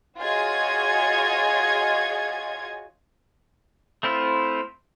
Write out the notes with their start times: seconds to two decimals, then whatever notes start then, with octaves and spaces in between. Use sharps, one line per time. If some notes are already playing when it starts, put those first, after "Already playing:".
0.19 F4 F#4 G#4 C#5 D#5 G#6
4.03 A3 C4 E4 F4